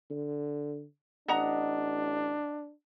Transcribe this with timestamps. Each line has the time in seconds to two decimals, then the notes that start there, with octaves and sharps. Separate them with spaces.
0.11 D3
1.28 A1 D4 D#5 F#5 A#5